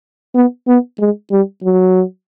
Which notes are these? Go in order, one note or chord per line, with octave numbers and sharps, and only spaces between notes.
B3
B3
G#3
G3
F#3